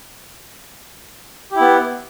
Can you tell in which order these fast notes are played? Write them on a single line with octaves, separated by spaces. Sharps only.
G4 E4 B3